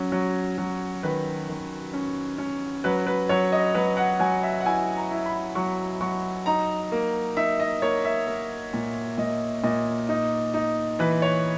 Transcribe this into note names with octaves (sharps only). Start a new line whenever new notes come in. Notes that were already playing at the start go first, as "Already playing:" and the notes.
Already playing: F#3 C#4
F#3
F#3
D#3 B4
D#3
C#4
C#4
F#3 B4
B4
F#3 C#5
D#5
F#3 B4
F#5
F#3 G#5
E5
F#5
E4 G#5
A#5
E4
B5
F#3 C#6
F#3 C#6
D#4 A#5
A#3
D#4 E5
D#5
A#3 C#5
E5
A#3
A#2
A#2 D#5
A#2 D#5
D#4
D#4
E3 B4
C#5